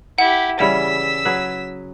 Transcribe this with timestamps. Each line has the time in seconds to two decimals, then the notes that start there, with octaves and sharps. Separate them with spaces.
0.18 E4 G4 F#5
0.60 C#3 E3 G3 E6 B6
1.25 F#3 G#4 B4